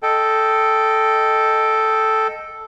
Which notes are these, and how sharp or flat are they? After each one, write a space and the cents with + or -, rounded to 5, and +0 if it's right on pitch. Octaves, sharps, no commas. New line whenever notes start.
A4 +0 D#5 +0 G5 +0